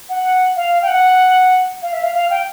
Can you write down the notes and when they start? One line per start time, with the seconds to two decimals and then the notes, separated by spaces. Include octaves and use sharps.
0.09 F#5
0.56 F5
0.82 G5
0.88 F#5
1.82 F5
1.93 E5
2.03 F5
2.14 F5
2.30 G5